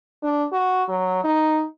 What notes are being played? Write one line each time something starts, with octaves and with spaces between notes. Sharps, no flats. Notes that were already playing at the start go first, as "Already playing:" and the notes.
D4
F#4
F#3
D#4